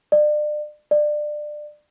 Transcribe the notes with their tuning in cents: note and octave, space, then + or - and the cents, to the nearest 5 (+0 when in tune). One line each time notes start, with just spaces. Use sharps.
D5 +35
D5 +25